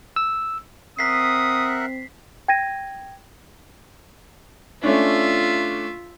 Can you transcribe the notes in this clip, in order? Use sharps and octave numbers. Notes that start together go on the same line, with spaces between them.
E6
C4 A#4 E5 F#5 D#6 B6 C7
G5 G#6 A#6 D#7
A3 C#4 D4 F4 E5